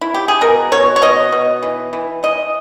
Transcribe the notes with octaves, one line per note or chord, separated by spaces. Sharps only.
E4
G4
G#4
B2 A#4
B2 C#5
C#5
B2 D#5
B2
E3
E3
E3 D#5